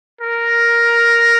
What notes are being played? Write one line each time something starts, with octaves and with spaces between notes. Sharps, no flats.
A#4